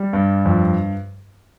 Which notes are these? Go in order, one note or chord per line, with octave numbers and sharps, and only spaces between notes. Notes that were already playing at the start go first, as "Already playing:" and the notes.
Already playing: G3
G2
F2